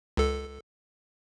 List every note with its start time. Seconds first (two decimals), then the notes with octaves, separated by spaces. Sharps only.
0.17 C#2 A4